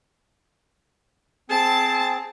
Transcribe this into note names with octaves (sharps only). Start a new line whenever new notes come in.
C4 G#4 A5